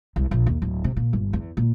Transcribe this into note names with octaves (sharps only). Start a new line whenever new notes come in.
C2
A#1
D#2
D1
C3
A#2
G1
E2
A#2